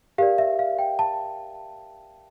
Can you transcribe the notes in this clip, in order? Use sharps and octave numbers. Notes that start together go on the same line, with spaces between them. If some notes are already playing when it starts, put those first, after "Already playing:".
G4 A#4 D5 F5
E5
F5
G5
A5